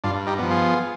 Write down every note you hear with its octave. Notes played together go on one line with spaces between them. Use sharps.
G2 D4 F4
D#4 G4
F3 B3
F4 G#4